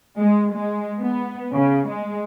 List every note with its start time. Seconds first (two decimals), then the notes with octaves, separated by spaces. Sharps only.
0.19 G#3
0.54 G#3
1.00 B3
1.54 C#3
1.89 G#3